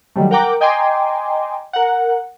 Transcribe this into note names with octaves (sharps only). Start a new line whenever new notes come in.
D#3 F#3 G3 A3
A#4 F#5 G5 A#5 D6
D#5 G5 G#5 A#5 C6 D6
A#4 F#5